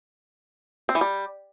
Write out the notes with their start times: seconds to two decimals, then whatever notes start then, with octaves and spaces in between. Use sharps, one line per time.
0.89 C4
0.95 E3
1.01 G3